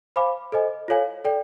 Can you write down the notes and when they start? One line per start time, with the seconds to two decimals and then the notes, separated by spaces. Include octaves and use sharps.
0.16 C5 F5 G#5 B5 D6
0.52 A4 C5 D#5 G#5
0.88 F4 A4 C#5 F5 G#5
1.24 A4 D5 G5